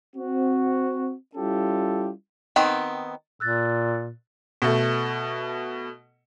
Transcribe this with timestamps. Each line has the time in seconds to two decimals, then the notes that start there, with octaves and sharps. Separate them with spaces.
0.17 C4 F#4
1.36 G3 C#4 E4 F4 G4 A4
2.56 D#3 B3 C4
3.40 A#2 E6 F#6 A6
4.62 B2 A3